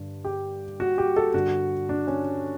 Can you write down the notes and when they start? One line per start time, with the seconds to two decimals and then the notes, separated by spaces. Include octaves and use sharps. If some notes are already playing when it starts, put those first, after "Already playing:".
Already playing: G2 D3
0.25 G4
0.80 F#4
0.98 G4
1.16 A4
1.34 G2 D3 F#4
1.89 D4
2.07 C#4